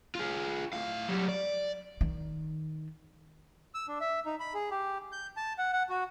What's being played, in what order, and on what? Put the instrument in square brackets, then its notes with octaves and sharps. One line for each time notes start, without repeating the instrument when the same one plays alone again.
[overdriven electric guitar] F4 G#4
A2 F5
F#3 G3
D5
[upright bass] D#3
[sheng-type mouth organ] E6
D4
E5
D#4
B5
G#4
G4
G6
A5
F#5
F#5
F#4